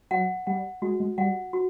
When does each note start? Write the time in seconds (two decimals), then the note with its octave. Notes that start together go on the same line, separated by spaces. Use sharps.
0.11 F#3 F#5
0.47 G3 F#5
0.82 G#3 F#4
1.00 G#3
1.18 G3 F#5
1.53 F#4